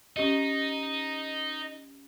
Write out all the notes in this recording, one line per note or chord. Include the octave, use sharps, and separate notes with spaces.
C#4 D#4 G4 D#5